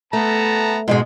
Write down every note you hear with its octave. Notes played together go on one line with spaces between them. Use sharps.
A3 B3 A5 A#5
G#2 B2 G#3